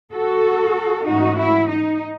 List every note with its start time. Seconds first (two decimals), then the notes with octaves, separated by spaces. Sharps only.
0.12 F#4 A4
1.05 G#2 E3 A3 C#4 D#4 F#4
1.37 E4
1.69 D#4